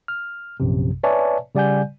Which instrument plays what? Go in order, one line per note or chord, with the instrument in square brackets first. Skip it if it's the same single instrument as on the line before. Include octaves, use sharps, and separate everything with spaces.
[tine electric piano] F6
A#1 F#2 C3
B4 C#5 D5 E5 G#5 A5
C#3 G3 D5 F#5 G#5 G6